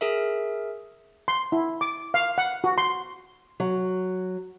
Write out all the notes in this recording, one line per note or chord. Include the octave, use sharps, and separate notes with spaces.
G#4 A#4 E5
C6
E4
D6
F5
F#5
F#4
C6
F#3